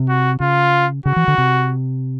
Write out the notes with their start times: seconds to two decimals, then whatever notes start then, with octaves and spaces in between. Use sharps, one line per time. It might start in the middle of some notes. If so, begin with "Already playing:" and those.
Already playing: C3
0.08 F#4
0.40 C#3 F4
1.06 C#3 F#4
1.16 E3
1.28 D3
1.38 C3